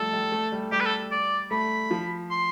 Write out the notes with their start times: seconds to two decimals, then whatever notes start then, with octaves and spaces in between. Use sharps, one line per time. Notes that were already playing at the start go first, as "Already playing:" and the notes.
Already playing: F3 G3 A3 A4
0.13 G3
0.32 A3
0.52 G3
0.72 G3 G4
0.80 B4
0.85 A4
1.11 D5
1.51 A3 B5
1.91 F3
2.30 C6